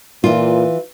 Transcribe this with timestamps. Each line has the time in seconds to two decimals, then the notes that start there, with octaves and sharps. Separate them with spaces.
0.24 A#2 E3 F4